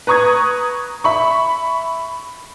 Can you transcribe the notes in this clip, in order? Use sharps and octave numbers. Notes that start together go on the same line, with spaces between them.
B4 A#5 C#6 D#6 G#6
E5 B5 C#6